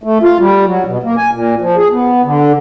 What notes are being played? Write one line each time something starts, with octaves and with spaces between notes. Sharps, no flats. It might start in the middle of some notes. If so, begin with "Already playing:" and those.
A3
F4
G3
F#3
B2
A#3
G#5
A#2
F3
G#4
B3
D3